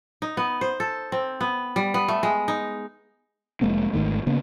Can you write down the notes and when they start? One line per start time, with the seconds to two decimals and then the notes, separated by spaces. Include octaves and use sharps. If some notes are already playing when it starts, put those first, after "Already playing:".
0.22 D#4
0.37 B3
0.61 C5
0.80 A4
1.12 C4
1.41 B3
1.76 G3
1.94 B3
2.08 A3
2.23 G#3
2.48 D#4
3.61 F1 G#3 A#3 C4
3.93 G#1 G#2 D#3 A3
4.27 C#3 A#3 B3